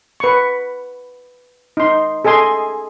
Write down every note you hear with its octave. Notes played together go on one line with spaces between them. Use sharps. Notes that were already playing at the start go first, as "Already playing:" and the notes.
B4 C#6
D#4 C6
G#4 A4 D#5 G#5 C6